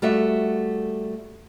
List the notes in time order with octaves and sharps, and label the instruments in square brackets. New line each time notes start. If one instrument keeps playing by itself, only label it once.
[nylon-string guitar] G3 A3 F#4 E5